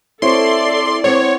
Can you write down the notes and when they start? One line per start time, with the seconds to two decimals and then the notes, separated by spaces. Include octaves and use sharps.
0.22 C4 E4 A4 C#5 D5 C6
1.04 B3 C4 C#5